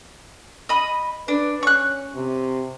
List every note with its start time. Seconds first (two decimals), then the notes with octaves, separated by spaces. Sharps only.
0.69 D#5 B5
1.28 D4 B4
1.63 C#4 C#6 F#6
2.15 C3